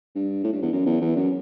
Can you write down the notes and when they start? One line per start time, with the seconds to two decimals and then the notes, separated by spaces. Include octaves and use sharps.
0.15 G2
0.44 A2
0.53 G2
0.62 E2
0.72 F#2
0.86 E2
1.01 E2
1.16 F#2